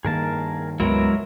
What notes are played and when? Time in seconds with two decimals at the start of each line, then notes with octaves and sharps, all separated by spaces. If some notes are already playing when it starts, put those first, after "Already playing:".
0.05 G2 D#3 A#3 G#4 A#4 A5
0.80 C#2 G2 F#3 G#3 B3 E4 A#4